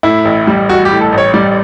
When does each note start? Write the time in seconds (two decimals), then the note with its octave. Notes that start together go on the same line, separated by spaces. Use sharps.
0.03 A2 E4
0.25 A1
0.47 G3
0.69 A1 F#4
0.85 G4
0.91 A2
1.01 A4
1.12 A1
1.18 C#5
1.34 G3 D5